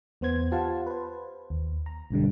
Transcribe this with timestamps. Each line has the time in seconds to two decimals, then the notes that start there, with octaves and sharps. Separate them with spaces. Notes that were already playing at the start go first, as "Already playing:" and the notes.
0.21 E2 B3 C5 G#6
0.52 F4 G4 C5 F5 F#5 A5
0.86 B4 C5
1.50 D#2
1.86 A#5
2.10 B1 G2 D3 G3